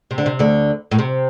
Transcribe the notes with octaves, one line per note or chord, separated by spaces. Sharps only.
C3
D3
C3
D2 D3
A2
C3